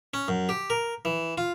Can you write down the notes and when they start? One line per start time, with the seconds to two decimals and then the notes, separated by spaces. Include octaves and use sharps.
0.14 C#4
0.28 F#2
0.49 G4
0.70 A#4
1.05 E3
1.38 F4